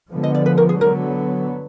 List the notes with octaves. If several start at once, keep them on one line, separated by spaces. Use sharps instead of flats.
D3 F3 G#3 B3
D#5
D5
B4
A#4
G#4
D3 F#3 B3 A#4